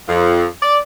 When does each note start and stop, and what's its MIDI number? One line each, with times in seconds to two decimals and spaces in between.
0.08 0.46 41
0.62 0.78 74